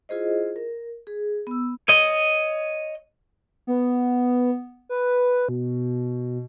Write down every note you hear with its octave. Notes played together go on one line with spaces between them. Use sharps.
E4 F4 G#4 C5 D#5
A#4
G#4
B3 E6
C#5 D#5
B3
B4
B2